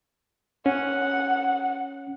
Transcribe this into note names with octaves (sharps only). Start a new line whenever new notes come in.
C#4 F#5